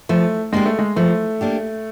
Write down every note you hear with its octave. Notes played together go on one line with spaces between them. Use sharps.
F3 A3
G#3 A#3 D4 G4
A3
G#3
F3 A3
A#3 D4 G4